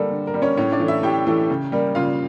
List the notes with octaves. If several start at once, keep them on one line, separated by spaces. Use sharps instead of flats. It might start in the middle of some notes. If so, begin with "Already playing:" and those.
Already playing: D3 G3 A#3 A4
D3
A#4
G3 A#3
C#4 C#5
A2 C#4 C#5
D4 D5
E3 A3
E4 E5
A2 G4 G5
E3 A3
C#3
G3 A#3
C#3 F4 F5